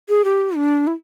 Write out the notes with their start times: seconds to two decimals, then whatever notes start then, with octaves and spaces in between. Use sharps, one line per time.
0.09 G#4
0.24 G4
0.56 D4
0.87 E4